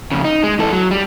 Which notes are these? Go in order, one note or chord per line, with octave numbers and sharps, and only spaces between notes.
F2 C#3
D#4
G#3
E3 A4
F#3
G3